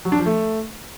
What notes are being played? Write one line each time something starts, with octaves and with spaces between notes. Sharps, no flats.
F#3
D4
F3
A3